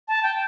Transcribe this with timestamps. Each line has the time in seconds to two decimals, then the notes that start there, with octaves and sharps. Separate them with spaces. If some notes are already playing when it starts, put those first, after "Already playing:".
0.08 A5
0.23 G5